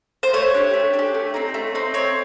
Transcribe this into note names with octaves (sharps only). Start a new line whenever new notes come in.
C5
A3 C#5
D4 G4
A3
D4
G4
A3
C4 D#4
A3
C4 D#4
C4 C#5